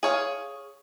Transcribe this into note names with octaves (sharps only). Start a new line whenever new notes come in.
G#4 C#5 F5